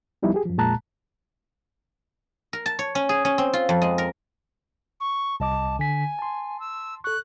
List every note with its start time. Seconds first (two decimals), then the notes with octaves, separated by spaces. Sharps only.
0.23 F3 G3 B3 D#4 E4
0.34 G4 G#4
0.46 F#2 F3
0.58 F2 A#2 G#3 A5 A#5 F#6
2.53 A#4
2.66 A5
2.79 C#5
2.95 C#4
3.09 G#4
3.25 C#4
3.38 C4
3.53 F4
3.69 F2
3.82 G#3
3.98 A#4
5.00 C#6
5.40 C2 D#5 A5 D6
5.79 D3 G#5 B6
6.19 A5 C6
6.60 E6
7.04 A4 C#6 F#6